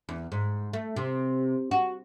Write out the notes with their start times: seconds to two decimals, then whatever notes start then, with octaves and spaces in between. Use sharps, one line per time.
0.09 E2
0.32 G#2
0.73 A3
0.96 C3
1.71 F#4